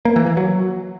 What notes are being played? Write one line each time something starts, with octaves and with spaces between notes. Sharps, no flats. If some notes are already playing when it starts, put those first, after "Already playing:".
A#3
E3
E3
F#3